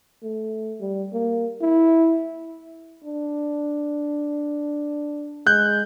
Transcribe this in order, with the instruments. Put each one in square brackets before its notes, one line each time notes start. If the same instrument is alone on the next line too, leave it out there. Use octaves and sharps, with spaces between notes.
[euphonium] A3
G3
A#3
E4
[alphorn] D4
[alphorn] G#3 [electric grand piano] F#6 G6